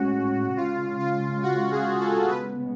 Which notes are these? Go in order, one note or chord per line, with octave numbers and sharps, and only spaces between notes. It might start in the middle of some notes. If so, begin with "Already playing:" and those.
Already playing: A2 G#3 C#4 F#4
C#3 G#3 C#4 F4
F4
F#4
G#4
A4
C#3 G#3 B3 B4